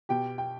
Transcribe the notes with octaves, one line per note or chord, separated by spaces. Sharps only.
B2 G4 G5
G5